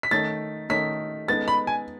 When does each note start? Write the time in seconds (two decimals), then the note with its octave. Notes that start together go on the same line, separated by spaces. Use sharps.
0.03 B6
0.11 D#3 A3 D#4 A4 C#5 A6
0.69 D#3 A3 D#4 A4 C#5 B6
1.28 G#3 B3 D#4 A4 A6
1.48 B5
1.67 G#5